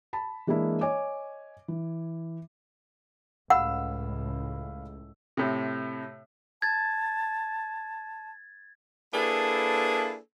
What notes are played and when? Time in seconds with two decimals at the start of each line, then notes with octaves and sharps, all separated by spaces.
0.13 A5 B5
0.47 E3 G#3 A#3 D4 E4
0.81 C#5 D#5 G#5 D6
1.68 E3
3.50 C#2 A2 F5 F#5 B5 E6
5.37 A2 C3
6.62 A5 G#6 A6
9.13 A#3 D4 E4 G#4 A4 B4